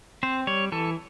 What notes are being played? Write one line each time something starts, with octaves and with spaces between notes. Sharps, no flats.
C4 C5
G3 C#5
E3 A4